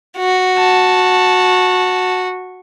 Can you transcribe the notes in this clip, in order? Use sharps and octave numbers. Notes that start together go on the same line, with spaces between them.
F#4
A5